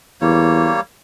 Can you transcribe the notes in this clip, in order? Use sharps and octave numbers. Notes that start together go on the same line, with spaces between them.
E2 G3 A#3 C#5